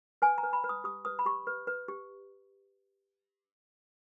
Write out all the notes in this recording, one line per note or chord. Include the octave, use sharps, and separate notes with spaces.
B4 G#5
A#5
B4
B5
B4
D#6
G4 D#6
B4 D#6
B5
G4 C#6
B4
B4
G4